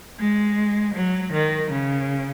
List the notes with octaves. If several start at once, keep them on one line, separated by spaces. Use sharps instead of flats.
G#3
F#3
D#3
C#3